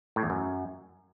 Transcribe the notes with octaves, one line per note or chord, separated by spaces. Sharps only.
A2
E2
F#2